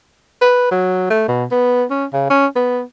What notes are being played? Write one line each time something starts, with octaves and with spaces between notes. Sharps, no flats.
B4
F#3
A3
B2
B3
C#4
C#3
C#4
B3